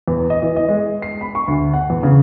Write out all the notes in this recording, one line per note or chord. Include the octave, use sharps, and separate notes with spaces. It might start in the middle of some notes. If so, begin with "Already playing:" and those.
E2
D#5
E3
D#5
G#3
C7
B5
C#6
D2
F#5
E2
C#3